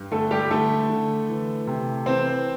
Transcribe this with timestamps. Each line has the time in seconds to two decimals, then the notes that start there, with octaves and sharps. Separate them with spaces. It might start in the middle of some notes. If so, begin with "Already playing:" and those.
Already playing: G2
0.11 D3 A3 A4
0.31 G3 G4
0.50 D3 A3 A4
0.90 D3
1.29 E3
1.67 C3
2.06 E3 C4 C5